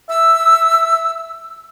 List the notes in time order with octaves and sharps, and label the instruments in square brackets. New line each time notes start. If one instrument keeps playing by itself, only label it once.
[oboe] E5 [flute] E6